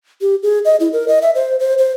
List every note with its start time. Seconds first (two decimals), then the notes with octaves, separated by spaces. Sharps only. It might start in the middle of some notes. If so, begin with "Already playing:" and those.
0.21 G4
0.43 G#4
0.65 D#5
0.80 E4
0.93 A#4
1.08 D#5
1.22 E5
1.35 C5
1.60 C5
1.78 C5